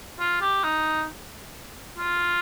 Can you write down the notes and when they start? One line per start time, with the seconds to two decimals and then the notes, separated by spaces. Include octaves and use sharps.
0.19 F4
0.41 G4
0.64 D#4
1.98 F4